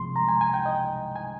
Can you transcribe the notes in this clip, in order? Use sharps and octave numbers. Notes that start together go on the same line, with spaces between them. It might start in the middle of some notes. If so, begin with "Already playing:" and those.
Already playing: C2 C3 F3 G#3 C6
A#5
G#5
G#5
G5
D#5
G#5